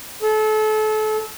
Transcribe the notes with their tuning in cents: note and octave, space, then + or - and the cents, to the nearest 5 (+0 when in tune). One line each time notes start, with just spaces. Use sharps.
A4 -30